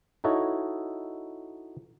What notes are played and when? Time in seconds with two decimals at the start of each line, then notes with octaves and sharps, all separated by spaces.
0.24 D#4 E4 F#4 A4 C#5 D#5